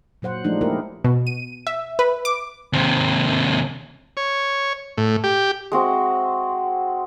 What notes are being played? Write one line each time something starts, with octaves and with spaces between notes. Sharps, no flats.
A#2 F#3 C5 F#5
F3 F#3 G#3 A3 D4 D#4
A#3 E4 G4 A#4
B2
D#7
E5
B4
D6
D#2 C3
C#5
A2
G4
G#3 C4 F#4 E5